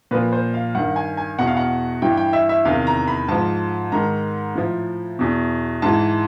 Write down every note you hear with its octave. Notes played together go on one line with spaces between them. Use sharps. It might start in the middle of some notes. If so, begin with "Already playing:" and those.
A#2 F3 B4
C5
F5
G2 D#3 F#5
G#5
G#5
E2 B2 F#5
F5
F#5
G2 E3 G5
G5
E5
E5
E2 C3 D#3 F5
A#5
B5
G#2 F3 A5
G#2 D#3 A#5
A2 F3
E2 B2
G#2 E3 A5